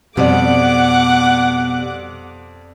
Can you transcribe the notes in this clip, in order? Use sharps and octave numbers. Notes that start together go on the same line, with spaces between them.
F2 B2 G3 D5 F#5 D6